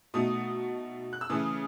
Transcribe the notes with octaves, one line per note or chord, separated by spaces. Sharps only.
B2 A3 D#4 D#6
F#6
E6
C#3 E3 A3 D#6